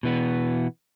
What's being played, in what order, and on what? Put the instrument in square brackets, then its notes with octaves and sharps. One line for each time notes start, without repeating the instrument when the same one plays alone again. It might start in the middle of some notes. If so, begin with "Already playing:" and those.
[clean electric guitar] B2 E3 B3